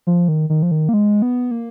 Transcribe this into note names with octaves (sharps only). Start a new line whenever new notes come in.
F3
D#3
D#3
F3
D#3
A#3
G#3
B3
A#3